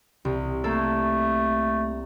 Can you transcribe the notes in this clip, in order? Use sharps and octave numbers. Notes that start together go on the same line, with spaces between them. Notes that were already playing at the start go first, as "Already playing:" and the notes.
C2
A3 A#3 A4